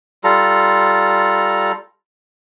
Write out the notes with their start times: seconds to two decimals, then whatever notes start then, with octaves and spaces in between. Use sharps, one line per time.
0.24 G3 F4 A4 A#5